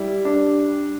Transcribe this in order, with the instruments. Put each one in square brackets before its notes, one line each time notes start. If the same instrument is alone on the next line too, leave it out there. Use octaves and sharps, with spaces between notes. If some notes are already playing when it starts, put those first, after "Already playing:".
Already playing: [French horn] G3 [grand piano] E4
[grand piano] D4